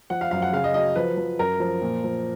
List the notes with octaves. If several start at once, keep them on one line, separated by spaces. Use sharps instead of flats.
F3 F#5
F5
F#2 F5
F#5
C#3 F5
D#5
F#3 D#5
F3 B4
F3
F#2 A#4
F3
A#2
F3